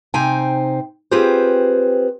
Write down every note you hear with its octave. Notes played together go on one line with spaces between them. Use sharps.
C3 D#4 C5 G5 G#5
C4 F4 G4 G#4 B4 C5